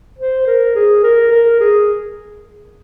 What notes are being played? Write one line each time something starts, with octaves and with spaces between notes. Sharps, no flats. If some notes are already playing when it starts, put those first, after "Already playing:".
C5
A#4
G#4
A#4
A#4
G#4